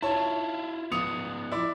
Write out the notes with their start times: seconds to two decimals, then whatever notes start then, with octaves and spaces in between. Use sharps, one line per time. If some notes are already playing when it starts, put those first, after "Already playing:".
0.03 E4 F4 C#5 A5
0.92 F3 B3 D#6 C#7 F7
1.52 E4 D5